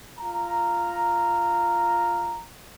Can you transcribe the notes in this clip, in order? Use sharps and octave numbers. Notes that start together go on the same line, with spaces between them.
F4 A#5